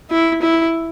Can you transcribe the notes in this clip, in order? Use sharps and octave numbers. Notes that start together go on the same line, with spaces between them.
E4
E4